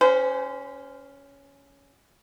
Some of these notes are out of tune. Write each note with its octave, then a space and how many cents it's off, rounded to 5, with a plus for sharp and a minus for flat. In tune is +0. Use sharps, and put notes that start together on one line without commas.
C#4 +10 G#4 -45 C5 -30